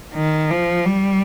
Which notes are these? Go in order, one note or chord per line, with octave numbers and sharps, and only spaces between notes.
D#3
F3
G3